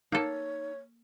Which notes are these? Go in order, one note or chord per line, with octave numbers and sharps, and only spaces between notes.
A#3 D#4 A4 C#5